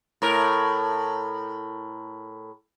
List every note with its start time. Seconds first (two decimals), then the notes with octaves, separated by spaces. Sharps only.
0.22 A2 A#4